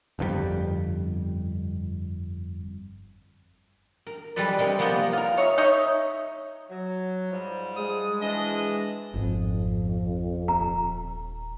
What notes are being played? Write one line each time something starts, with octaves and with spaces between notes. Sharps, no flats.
G1 F2 D3 G3
A#4
G3 G#3 A4 B4 D5
C3 G3 G#3 A#4
F3 A#3 B3 G4 D#5
F4 A#4
C#5 D#5 E5
D#4 C#5 D#5 E5
F#3
G#2 F3 G3
G#3 D#6
E3 F3 D4 D#5
G#1 F2 B3
D#1 A#5